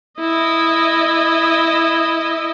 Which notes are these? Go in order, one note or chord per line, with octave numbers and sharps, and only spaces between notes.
E4 D#5